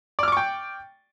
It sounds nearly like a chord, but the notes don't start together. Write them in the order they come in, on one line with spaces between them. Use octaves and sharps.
D5 F6 D6 C#6 G5